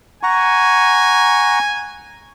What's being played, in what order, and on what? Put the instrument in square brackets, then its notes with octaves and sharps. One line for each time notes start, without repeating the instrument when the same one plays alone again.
[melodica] F#5 A#5 C#6 [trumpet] G#5